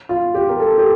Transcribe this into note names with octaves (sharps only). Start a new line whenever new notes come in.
F4
G4
A#4
A4
G4